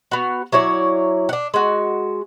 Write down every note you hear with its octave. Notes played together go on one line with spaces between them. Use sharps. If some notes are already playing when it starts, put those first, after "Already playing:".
B3 F#4
F#3 E4 C#5 D5
D4 F#5
G#3 F#4